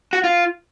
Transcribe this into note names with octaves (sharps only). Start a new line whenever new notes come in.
F#4
F4